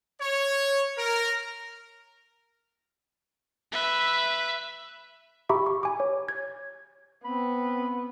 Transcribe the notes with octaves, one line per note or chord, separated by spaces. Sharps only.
C#5
A#4
B4 E5
G4 E5 A#5 B5 C#6 D6
C#6
G#5 D6
C#5
G#6
B3 C4 B5